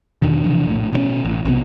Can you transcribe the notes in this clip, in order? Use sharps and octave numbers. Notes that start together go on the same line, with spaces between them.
E2 B2 D3 D#3
C3 E3 F3 D4
A#1 A2
B2 D#3 C#4
A1
B1 C3 F3 B3